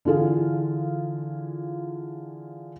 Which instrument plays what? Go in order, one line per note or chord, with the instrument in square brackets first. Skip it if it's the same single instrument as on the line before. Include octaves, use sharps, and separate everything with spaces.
[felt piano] D3 E3 F4 G#4